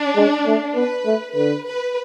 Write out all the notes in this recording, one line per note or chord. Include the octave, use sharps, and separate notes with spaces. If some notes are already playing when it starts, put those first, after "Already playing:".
Already playing: D4
G#3
A3
B3 B4
A3
D3 B4
B4